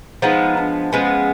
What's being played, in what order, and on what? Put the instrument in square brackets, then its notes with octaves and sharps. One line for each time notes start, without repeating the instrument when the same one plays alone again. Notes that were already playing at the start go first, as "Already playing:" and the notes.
[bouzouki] F3 G#3 B3 [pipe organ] D#4
[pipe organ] D4
[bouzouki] F3 G#3 B3 [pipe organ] C#4